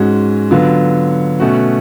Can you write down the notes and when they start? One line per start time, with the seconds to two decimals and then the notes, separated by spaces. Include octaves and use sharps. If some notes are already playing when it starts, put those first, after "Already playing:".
Already playing: G#2 G#3 C#4 F#4
0.51 D3 F#3 B3 F4
1.40 B2 A3 C#4 F#4